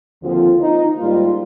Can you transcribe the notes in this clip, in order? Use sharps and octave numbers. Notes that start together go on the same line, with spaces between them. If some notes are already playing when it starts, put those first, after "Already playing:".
D#2 D3 F3 C4 F4
D#4
G#2 G3 A#3 F4